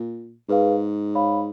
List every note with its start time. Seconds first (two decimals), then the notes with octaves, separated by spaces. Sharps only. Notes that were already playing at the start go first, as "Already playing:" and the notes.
Already playing: A#2
0.49 G#2 G#4 B4 F5
1.15 C#5 F5 B5